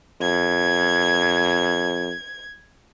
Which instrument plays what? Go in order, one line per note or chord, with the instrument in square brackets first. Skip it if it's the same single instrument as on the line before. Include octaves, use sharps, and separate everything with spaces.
[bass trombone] F2 [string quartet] G#6